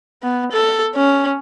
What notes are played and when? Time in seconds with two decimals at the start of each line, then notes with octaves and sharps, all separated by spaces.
0.23 B3
0.51 A4
0.95 C#4